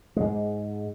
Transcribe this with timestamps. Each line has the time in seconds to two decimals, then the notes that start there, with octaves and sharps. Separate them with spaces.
0.16 G#2 G#3